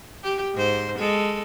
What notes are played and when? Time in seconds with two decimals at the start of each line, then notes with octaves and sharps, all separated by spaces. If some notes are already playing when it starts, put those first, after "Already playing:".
0.23 G4
0.54 G#2 C5
0.98 G#3 A4